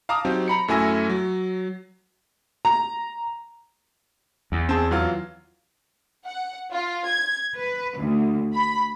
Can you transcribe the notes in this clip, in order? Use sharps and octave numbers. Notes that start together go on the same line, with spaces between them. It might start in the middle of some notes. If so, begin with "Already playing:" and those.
F5 A5 A#5 D6 D#6
F#3 C4 D#4 G4
A#5 B5 C#7
F#2 A3 E4 G#5 E6 A#6
F#3
A#5
E2
C4 G#4 A5
E3 F#3 F4
F#5
F4
G#6
B4
D2
B5